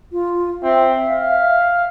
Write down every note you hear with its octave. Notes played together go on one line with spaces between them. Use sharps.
F4
C4 E5
F5